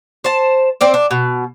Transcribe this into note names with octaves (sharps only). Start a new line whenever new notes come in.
C5 A5
C4 C5 D5
D4
B2